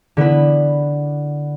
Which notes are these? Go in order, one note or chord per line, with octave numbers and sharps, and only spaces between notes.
D3 B3 E4 B4